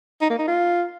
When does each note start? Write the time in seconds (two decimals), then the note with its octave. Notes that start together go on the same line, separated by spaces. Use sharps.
0.21 D#4
0.30 A#3
0.39 D#4
0.48 F4